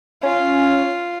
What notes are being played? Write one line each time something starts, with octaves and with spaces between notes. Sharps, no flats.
C#4 F4